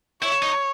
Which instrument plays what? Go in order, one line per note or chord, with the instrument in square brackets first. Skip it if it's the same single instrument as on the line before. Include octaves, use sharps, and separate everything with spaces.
[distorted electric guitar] E4 [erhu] C#5
[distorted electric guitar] D#4